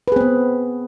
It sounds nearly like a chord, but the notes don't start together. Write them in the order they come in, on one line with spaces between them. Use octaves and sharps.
B4 G#4 C4 B3